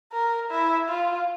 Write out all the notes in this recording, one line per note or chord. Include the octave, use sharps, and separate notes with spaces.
A#4
E4
F4